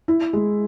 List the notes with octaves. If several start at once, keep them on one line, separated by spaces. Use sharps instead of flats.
E4
G#3